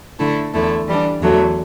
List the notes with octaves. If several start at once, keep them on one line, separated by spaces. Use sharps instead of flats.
D3 A3 E4
E2 D3 A3 E4
E3 G3 D4
E2 D3 F#3 A3